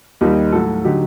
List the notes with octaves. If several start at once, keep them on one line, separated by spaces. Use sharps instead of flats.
D#2 D#3 G3 D#4 G4
A2 F#3 F#4 A4
D3 F#3 D#4 G4